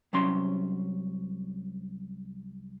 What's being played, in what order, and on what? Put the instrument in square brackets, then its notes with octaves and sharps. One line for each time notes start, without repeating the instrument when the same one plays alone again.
[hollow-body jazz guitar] C2 F#3 C#4 C6